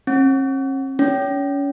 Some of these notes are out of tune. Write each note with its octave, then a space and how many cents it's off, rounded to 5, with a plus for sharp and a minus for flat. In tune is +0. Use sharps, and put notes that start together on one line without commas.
C#4 -45
C#4 +30